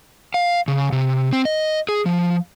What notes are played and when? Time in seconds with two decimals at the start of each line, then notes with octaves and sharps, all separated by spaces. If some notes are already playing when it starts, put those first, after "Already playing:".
0.34 F5
0.68 C#3
0.92 C3
1.33 C4
1.45 D#5
1.89 G#4
2.06 F3